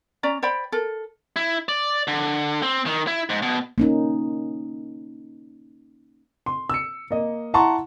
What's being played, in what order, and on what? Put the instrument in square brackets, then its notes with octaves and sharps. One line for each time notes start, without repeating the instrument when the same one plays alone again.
[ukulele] C#4 D5 A#5
C5 D5 G5 B5
A4 A#4
[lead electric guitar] E4
D5
D3
C4
D#3
E4
G#2
B2
[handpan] A#3 C#4 D#4
[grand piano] C6
E6 C#7
A#3 D#5
E4 F#5 A5 A#5 C6 C#6